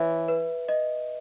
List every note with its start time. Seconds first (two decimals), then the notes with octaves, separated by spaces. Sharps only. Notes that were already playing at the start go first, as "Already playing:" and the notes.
Already playing: E3 C#5 E5
0.28 B4
0.68 D#5